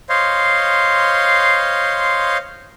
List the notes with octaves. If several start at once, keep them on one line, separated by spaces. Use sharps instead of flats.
C5 C#5 D#5 F5 C6